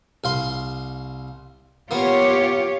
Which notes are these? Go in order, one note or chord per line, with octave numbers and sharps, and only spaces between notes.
C2 F5 C6
A#3 B3 F4 G4 C#5